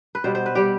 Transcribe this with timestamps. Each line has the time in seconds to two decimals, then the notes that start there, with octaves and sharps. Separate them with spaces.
0.15 B4
0.24 B2 G3 C5
0.35 C5
0.46 B4
0.55 G3 G4